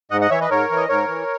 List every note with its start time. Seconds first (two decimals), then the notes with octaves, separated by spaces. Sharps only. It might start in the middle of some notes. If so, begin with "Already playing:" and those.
0.11 G#2 D#5 F#5
0.21 D#5 F#5
0.30 E3 C#5 E5
0.41 B4 D#5
0.50 G#2 A#4 C#5
0.70 E3
0.77 D#5
0.88 G#2 A#4 C#5
1.08 E3